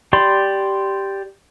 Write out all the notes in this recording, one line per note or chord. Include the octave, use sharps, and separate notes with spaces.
G4 D5 B5 C6